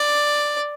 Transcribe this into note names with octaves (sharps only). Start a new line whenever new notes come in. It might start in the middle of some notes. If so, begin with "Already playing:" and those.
Already playing: D5